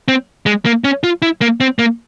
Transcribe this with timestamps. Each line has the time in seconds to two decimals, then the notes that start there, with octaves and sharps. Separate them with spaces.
0.08 C4
0.46 G#3
0.65 A#3
0.84 C#4
1.03 F4
1.22 E4
1.41 A#3
1.60 C4
1.79 A#3